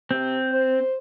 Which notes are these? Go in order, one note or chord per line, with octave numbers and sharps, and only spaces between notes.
C3 C4
C5